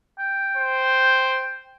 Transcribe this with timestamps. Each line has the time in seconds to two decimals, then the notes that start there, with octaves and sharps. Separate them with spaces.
0.19 G5
0.57 C5